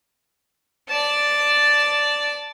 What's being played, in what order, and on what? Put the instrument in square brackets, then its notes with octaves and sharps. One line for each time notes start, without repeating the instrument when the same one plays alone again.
[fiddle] D5 A5